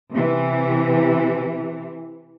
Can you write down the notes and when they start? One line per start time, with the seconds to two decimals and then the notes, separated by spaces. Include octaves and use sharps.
0.12 C3 E3